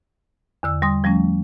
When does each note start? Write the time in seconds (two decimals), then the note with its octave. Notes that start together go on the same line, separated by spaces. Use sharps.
0.63 E2 D3 E6
0.82 G3 C6 D#6
1.04 F3 G3 A3 C#4